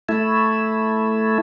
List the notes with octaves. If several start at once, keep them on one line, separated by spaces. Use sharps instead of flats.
A3 E4